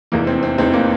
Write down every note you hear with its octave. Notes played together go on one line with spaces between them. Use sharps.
F1 E2 E3 A#3
C4
C4
F1 E2 E3 C4
A#3